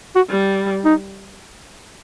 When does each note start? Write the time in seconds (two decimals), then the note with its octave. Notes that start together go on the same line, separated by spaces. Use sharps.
0.16 F#4
0.30 G3
0.85 D#4